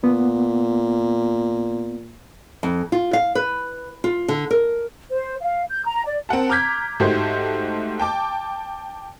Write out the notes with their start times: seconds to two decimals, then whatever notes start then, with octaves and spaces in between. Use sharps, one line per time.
0.04 A#2 B3
2.63 F2
2.92 F4
3.13 F5
3.35 B4
4.04 F4
4.28 D3
4.51 A#4
5.11 C5
5.40 F5
5.70 G6
5.85 A#5
6.05 D5
6.29 C4 A#4 F#5 A5
6.49 A#5 D6 F6 G6 G#6 B6
7.00 G#2 A3 F#4 G4 C5
8.00 G5 A5 D6